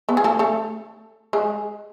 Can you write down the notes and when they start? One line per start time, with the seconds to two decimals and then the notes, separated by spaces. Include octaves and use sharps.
0.09 B3 B4
0.17 G#4
0.24 A3 A4
0.39 A3 A4
1.33 G#3 G#4